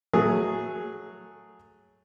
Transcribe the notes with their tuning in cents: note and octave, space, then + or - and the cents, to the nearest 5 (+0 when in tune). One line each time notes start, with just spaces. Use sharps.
F#3 +0 A3 +0 G#4 +0